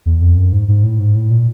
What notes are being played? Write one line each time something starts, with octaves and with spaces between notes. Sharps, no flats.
E2
F2
F#2
G#2
G#2
A2
G#2
A2
A#2